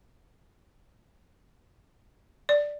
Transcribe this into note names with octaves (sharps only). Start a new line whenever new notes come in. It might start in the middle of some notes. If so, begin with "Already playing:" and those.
D5